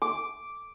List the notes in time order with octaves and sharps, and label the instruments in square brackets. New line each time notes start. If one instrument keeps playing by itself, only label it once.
[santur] D6